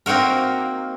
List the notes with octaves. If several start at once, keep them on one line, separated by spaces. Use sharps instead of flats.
A#3 C4 D#4 F#4 A#4